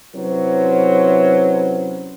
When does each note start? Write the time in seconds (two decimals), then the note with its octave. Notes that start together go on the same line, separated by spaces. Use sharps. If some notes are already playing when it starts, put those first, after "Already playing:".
0.16 C3 F#3 C#4 E4 B4 C5